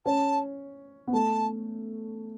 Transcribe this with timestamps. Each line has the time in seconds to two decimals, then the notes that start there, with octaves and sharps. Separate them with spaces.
0.05 C#4 A5
1.07 B3
1.13 A3 A5